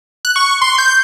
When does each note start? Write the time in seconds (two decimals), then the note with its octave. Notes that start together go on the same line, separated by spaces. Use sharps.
0.25 F#6
0.36 C#6
0.61 C6
0.78 G6